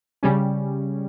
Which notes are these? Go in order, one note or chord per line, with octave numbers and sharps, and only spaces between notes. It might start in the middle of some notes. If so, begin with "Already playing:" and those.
C#3 G3 C#4